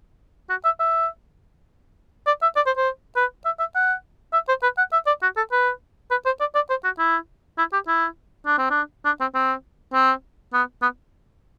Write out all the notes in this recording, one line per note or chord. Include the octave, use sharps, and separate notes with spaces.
F#4
E5
E5
D5
E5
D5
C5
C5
B4
E5
E5
F#5
E5
C5
B4
F#5
E5
D5
F#4
A4
B4
B4
C5
D5
D5
C5
F#4
E4
E4
G4
E4
D4
C4
D4
D4
C4
C4
C4
B3
B3